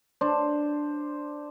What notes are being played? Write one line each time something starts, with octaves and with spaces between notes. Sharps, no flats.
D4 C5